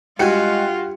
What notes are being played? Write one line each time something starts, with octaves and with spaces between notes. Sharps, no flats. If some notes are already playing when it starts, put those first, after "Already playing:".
G2 G#3 F4 F#4 G5 G#5 C#7